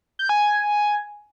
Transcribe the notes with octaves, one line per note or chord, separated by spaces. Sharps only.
G6
G#5
G#5